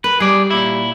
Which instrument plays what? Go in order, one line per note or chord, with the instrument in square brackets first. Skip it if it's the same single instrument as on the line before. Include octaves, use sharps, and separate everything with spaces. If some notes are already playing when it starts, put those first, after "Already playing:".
[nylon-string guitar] A#4 [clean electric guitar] B4
[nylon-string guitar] G3 [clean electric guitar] G#4 D5
[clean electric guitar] A#2 E4